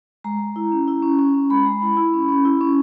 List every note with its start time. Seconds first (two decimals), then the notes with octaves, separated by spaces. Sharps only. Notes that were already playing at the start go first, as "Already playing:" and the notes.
0.24 G#3 A#5
0.40 G#3
0.56 E4
0.72 C#4
0.88 E4
1.02 C#4
1.19 C#4
1.34 C#4
1.50 G#3 B5
1.66 G#3
1.82 E4
1.97 E4
2.14 C#4
2.29 C#4
2.45 E4
2.61 C#4